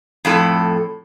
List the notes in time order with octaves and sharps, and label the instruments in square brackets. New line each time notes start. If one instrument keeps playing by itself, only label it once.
[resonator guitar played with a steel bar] F2 A2 A4